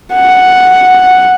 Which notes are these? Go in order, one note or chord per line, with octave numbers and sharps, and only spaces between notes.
F#5